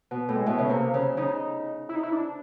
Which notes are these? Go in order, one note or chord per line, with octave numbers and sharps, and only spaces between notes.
B2
A2
G#3
B2 A3
C#3
C3 A#3
C#3
C#3 D#4
E4
D#4
E4
D4